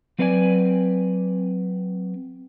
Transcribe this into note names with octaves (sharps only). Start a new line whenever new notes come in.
F#3 C4 B4 D5 F5 G#5